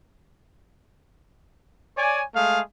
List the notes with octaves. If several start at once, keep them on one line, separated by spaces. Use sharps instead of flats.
C#5 D5 G#5
G#3 A3 G#4 F5